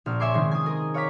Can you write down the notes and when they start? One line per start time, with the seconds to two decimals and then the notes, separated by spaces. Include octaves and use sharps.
0.06 A#1 F6
0.20 C#5 E5 G#5 C6 D6
0.34 C3 D#3 G#3 C#4
0.51 G#5 D#6
0.66 G#4 A#4
0.94 C#5 F5 F#5 A#5 D6 B6